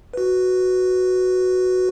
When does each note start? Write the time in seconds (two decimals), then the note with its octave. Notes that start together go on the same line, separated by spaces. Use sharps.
0.13 F#4 B4